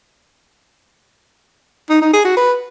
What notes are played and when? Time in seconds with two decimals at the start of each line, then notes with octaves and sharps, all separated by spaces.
1.90 D#4
2.01 D#4
2.13 G#4
2.25 F#4
2.37 B4